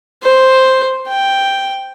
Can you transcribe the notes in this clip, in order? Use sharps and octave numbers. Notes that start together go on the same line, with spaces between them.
C5
G5